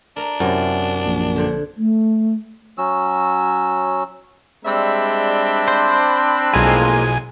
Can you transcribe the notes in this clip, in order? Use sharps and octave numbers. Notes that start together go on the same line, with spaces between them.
D4 A#4 A#5
F#2 C3 E4
A#1
D3 C5 C#5
A3
F#3 C#4 F#4 E6
G3 G#3 C4 D4 E5 B5
C5
B1 A2 F3 G#3 A#3 F4 G#5